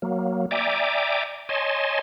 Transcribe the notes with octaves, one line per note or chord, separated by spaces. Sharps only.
F#3 A#3
D5 E5 G5 G#5 A#5 D6
C#5 D#5 G#5 A5 C6